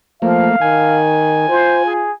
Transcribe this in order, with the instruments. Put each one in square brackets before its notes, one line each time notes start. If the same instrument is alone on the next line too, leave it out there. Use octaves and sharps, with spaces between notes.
[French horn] F3 [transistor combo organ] A3 A#3 [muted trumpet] F5
[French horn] D#3 [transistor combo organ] G#5
[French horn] F4 [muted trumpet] C5
[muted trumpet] G#4